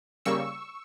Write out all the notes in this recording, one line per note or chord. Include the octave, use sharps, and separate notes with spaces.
C#3 G3 A#3 C#6 E6